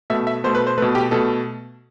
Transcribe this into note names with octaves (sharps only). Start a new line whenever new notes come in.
B2 A3 E5
E5
B2 A3 C5
B4
C5
B2 A3 B4
G4
B2 A3 A4